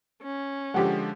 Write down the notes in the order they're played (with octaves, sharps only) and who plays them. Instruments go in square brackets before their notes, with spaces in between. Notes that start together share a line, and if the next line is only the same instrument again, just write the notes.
[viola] C#4
[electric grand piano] D3 F3 G#3 [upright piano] G4 F#5